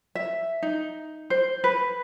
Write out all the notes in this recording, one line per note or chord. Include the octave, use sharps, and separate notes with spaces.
E5
D#4
C5
B4